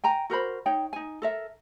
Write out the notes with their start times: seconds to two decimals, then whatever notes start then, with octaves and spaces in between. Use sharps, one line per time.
0.04 G5 G#5 A#5
0.30 F#4 A#4 C5 B5
0.66 D#4 C#5 G5
0.93 D#4 G#5
1.22 A4 A#4 E5